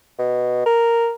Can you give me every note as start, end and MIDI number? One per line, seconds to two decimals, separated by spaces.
0.19 0.63 47
0.66 1.12 70